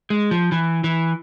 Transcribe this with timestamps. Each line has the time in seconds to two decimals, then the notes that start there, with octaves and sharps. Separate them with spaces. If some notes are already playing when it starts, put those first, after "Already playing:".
0.10 G#3
0.31 F3
0.52 E3
0.84 E3